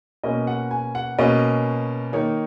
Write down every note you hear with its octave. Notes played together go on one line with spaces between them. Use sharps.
B2 A#3 C#4 D#5
F#5
G#5
F#5
B2 A#3 C#4 D#5
D#3 A#3 D#4 C#5